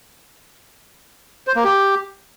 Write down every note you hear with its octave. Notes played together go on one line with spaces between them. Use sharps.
C5
A#3
G4